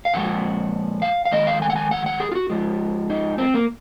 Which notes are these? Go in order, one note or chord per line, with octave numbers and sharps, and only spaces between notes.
F5
A#2 F3 G#3 F#5
F5
F5
F2 D#3 G#3 D#5
F5
G#5
F#5
G#5
F#5
F#5
G#4
F4
F#4
G#2 F3 G#3
D#4
C4
A#3